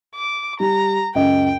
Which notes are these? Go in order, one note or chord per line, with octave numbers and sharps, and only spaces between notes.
D6
G3 A#5
C#2 F#2 D#5 G5